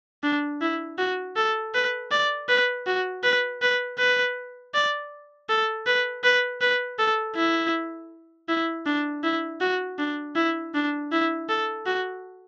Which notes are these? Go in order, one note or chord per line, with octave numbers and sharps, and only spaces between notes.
D4
E4
F#4
A4
B4
D5
B4
F#4
B4
B4
B4
D5
A4
B4
B4
B4
A4
E4
E4
D4
E4
F#4
D4
E4
D4
E4
A4
F#4